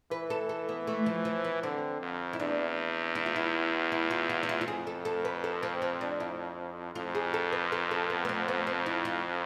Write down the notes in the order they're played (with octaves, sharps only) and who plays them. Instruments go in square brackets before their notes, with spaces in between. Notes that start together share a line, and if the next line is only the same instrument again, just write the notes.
[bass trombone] E3 [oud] B4
[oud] A4
A4
B3
A3
F3
F3
B3
[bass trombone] D3 [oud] C4
[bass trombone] F2
[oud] E4
[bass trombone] E2 [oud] D4
[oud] E4
F4
E4
E4
F4
F4
E4
F4
F4
[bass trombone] F2 [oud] G#4
[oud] A4
A4
B4
A4
C4
C4
D4
E4
[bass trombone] F2 [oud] F4
[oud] G#4
A4
B4
A4
A4
B3
B3
C4
B3
C4
E4
F4